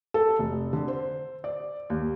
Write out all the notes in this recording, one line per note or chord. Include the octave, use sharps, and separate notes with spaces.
A4
F1
D3
C5
D5
D#2